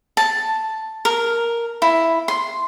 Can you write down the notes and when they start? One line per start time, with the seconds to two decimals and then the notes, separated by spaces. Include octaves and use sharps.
0.17 A5
1.05 A#4
1.82 E4
2.28 C6